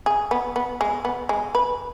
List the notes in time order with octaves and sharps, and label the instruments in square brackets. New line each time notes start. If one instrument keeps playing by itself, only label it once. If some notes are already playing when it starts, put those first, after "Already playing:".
[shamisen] G#4
B3
B3
G#3
B3
G#3
B4